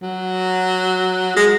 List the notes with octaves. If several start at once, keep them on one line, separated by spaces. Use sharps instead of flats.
F#3
G#3